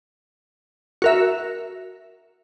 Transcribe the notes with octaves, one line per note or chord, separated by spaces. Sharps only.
F#4 A#4 E5